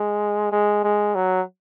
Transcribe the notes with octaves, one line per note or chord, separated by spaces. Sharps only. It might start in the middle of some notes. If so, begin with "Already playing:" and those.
Already playing: G#3
G#3
G#3
F#3